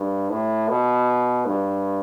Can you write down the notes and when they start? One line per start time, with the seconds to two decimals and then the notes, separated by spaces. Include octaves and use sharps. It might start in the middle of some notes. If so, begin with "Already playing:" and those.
Already playing: G2
0.30 A2
0.69 B2
1.46 G2